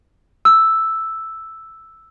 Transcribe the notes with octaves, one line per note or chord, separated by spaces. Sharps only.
E6